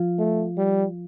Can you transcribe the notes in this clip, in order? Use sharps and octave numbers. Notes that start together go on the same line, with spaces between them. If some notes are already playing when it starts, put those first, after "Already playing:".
Already playing: F3 F4
A3
G3